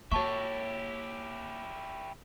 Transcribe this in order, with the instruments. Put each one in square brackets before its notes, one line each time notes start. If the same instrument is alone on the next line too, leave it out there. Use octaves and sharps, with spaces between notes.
[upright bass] A#3 [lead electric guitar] E4 G4 [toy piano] F#4 A5 C#6 [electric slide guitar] C#5 E5